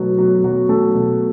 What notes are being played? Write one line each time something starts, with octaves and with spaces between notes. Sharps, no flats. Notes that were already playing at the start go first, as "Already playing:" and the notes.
Already playing: B2 F#3 A3 B3 F#4 B4
B2 F#3 F#4
B2 F#3 F#4
A3 A4
B2